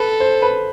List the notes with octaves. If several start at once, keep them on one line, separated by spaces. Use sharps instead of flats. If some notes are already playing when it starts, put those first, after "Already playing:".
Already playing: A4 B4
C5
B4